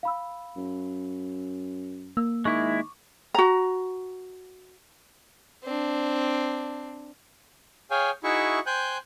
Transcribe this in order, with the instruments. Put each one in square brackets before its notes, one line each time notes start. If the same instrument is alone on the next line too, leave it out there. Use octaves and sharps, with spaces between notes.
[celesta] F5 B5 E6
[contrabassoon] F#2
[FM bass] A#3 [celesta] E6
[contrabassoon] D#3 [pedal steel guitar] G#3 E4 [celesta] C#6 D6
[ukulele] F#4 A#5
[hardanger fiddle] C4 D4
[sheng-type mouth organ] G#4 C#5 F5 G5 G#5
D#4 E4 F#4 G#4 E5 C#6
C5 G5 G#5 F#6 G6